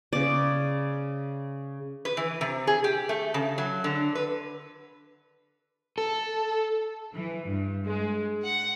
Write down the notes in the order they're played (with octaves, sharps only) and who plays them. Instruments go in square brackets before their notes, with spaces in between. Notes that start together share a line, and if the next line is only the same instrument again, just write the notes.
[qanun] C#3 D5
[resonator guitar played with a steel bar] B4
E3
C3
G#4
G4
A3
C#3
F#3
D3
B4
[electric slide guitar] A4
[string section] E3
G2
G#3
F#5